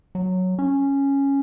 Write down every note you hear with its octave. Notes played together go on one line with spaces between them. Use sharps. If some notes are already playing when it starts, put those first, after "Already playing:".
F#3
C#4